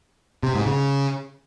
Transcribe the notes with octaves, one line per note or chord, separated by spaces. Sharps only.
C3
G#2
C#3